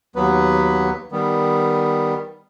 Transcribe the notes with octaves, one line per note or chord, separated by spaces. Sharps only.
D#2 F#3 B3 B4
D#3 G3 B3